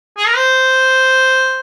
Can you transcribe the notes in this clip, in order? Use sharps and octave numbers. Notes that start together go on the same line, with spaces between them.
G#4
A#4
C5